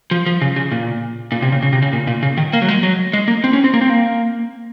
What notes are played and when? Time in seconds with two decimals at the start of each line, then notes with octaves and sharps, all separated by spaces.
0.11 F3
0.26 F3
0.42 C#3
0.56 C#3
0.72 A#2
1.32 A#2
1.42 C3
1.52 C#3
1.62 C#3
1.73 C3
1.82 C#3
1.93 A#2
2.07 A#2
2.23 C#3
2.38 D#3
2.53 A#3
2.62 F#3
2.69 G#3
2.83 F#3
3.13 G#3
3.28 A#3
3.44 C4
3.53 C#4
3.64 C4
3.74 A#3
3.81 C4
3.90 A#3